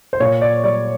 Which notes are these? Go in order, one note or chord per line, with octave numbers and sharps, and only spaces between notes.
C5
A#2 C#5
D5
G3 D5